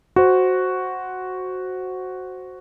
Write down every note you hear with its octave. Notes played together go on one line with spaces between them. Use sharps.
F#4 C5